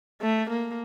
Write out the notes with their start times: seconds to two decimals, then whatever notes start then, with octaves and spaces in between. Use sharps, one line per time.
0.21 A3
0.50 A#3